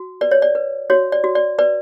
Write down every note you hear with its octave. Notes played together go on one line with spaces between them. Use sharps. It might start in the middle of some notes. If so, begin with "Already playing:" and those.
Already playing: F#4
B4 D5
C#5
D5
B4
F#4 C#5
D5
F#4
D5
B4 D5